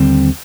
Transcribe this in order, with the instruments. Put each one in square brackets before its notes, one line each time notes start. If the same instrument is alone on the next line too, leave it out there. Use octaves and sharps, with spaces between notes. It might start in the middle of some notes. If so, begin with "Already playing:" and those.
Already playing: [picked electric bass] D#2 D3 G3 C4